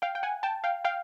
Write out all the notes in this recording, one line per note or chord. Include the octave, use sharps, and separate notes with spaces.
F5 G5
G5
F#5 G#5
G5 A5
F5 G5
F5 G5